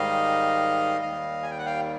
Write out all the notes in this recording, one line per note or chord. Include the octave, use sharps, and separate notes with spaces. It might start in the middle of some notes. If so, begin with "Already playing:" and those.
Already playing: G#2 D#3 G3 D#5 F5
D#2 D#3 G3 D#5 F5
G#5
G5
F#5
F5 G5